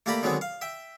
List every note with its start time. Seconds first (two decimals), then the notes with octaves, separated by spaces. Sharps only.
0.06 A3 A#3 G4 D5 A#5 B5
0.23 D3 D#3 F#3 G#3 B3 C4
0.41 F5
0.61 E5 G5